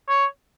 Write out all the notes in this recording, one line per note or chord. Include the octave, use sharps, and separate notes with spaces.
C#5